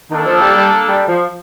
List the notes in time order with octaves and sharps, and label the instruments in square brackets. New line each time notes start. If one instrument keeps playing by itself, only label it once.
[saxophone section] D#3 [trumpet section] A#3 D4 A4
[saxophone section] F3
G3
G3
G3
F3